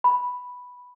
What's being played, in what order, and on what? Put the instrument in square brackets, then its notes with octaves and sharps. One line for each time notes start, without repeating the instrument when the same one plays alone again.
[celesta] B5